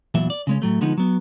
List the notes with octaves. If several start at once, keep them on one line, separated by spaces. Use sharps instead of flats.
E2 A#2 E3 F#3 E5
D5
C#3 G#3 C#4
A2 F#3 A3
D3 F3 G#3 B3 D#4
F#3 B3